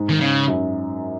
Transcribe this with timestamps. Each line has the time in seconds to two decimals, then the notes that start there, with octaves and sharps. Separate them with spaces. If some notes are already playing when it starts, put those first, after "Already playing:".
Already playing: G#2
0.09 D#3
0.20 C#3
0.48 F#2